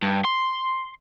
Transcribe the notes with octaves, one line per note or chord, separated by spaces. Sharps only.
G2
C6